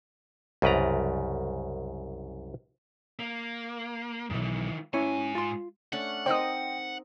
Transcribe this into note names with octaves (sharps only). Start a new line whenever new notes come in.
C2 F#2 C#3 B4 D5 A#5
A#3
B1 F#2 D#3 E3
G#2 C#4 E4 C#5 G#5
F4 C6
A3 C#4 D4 F#5
C4 D#4 A#4 C5 D#5 G5 D#6